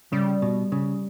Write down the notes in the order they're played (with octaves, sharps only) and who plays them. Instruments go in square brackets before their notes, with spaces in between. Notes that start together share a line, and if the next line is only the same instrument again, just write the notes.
[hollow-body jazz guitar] C#3 [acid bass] G3
[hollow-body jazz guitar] B2
C#3